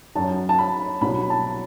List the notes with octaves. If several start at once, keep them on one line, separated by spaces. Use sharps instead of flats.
F#2 F#3 A5
A5
B5
C2 B2 F#3 B5
A5